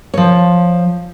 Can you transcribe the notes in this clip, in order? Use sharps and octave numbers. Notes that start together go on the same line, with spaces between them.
F3 C#5